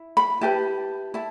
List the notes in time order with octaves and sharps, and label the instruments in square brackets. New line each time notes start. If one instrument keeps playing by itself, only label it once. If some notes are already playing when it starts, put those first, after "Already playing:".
Already playing: [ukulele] E4
B5
E4 G4 B4 A5
E4 A5